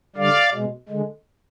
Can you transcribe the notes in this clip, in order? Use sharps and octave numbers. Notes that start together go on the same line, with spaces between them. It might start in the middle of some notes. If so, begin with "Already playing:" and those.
D3 G3 D5 F5
B2 G#3
D3 G#3